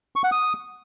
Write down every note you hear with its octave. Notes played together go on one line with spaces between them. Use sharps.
C#6
F#5
D#6